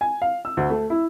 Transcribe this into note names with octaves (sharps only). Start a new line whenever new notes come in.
G#5
F5
E6
D2
A3
E4